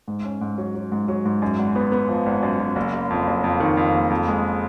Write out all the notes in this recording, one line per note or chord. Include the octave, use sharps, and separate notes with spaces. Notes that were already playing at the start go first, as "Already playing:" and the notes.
G#2
C#4
G#2
F#3
F#3
G#2
F#3
G#2
F#2
G#1
B3
B3
F3
G#1
F#2
F#2
F#1
F#1
F2
F#1
F2
D#3
F2
F#1
F2
G#3